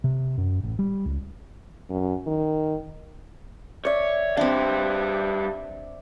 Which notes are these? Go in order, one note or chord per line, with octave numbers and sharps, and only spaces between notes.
C3
F#2
A1
G3
C#2
F#2
D#3
C#5 D5 E5
G3 C4 D4 F5